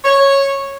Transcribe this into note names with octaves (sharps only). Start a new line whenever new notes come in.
C#5